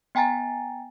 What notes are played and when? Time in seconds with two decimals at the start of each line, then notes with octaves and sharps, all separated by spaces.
0.15 B3 G5 G#5 A#5 A6